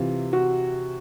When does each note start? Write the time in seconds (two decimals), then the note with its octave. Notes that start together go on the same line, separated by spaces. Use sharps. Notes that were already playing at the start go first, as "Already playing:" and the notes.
Already playing: C3 E3 F4
0.33 F#4